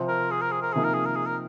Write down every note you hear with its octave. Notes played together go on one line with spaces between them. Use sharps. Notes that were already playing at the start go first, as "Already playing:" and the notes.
Already playing: C3 F3 C4
A#4
G#4
A#4
G#4
A#4
C3 F3 A#3 D#4 G#4
A#4
G#4
A#4
G#4
A#4